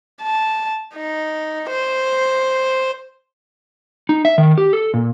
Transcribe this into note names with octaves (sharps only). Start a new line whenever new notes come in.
A5
D#4
C5
D#4
E5
D#3
G4
A4
A#2